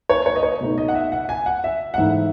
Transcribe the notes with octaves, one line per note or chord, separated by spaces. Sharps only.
C#5
C#5
D#5
C#5
B2 A3 D#4
D#5
F#5
E5
F#5
G#5
F#5
E5
F#5
G#2 E3 A3 D#4 E5